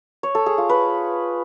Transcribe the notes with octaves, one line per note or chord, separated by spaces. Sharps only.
C#5
A4
G#4
F4
B4